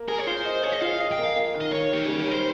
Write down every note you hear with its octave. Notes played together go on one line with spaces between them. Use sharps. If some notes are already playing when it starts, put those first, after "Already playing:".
Already playing: A#3
G#4 A#4
C#5
F4 C5
D#5
G#4 C#5
D#5
F4 F5
D#5
G5
A#3
F5
A#3
D#3
D#5
D#3 C#5
D#3 G4
G3 G#4
A#4
G3
C5